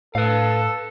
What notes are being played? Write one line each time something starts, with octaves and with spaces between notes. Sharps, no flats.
A2 A4 B4 F5